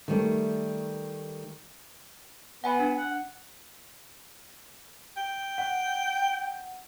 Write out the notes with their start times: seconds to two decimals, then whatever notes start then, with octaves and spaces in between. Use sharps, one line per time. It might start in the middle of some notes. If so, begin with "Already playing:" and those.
0.08 D#3 G3 A3
2.64 B3 F#5 G#5 B5
2.79 D4
2.98 F#5
5.17 G5
5.58 F#5